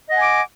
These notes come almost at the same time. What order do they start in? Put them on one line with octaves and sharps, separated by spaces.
D#5 F#5 G#5 D6